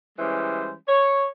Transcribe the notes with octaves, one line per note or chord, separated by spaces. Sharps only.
E3 G3 G#3 C#4 C5
C#5